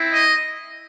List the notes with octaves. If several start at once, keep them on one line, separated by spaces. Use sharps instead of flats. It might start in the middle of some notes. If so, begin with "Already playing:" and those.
Already playing: C4 E4
D#5